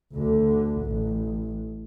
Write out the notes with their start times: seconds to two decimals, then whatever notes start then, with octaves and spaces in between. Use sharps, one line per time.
0.13 D2 D3
0.82 A1